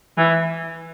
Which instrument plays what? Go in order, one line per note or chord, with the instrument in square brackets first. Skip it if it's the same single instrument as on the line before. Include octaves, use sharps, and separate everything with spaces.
[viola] E3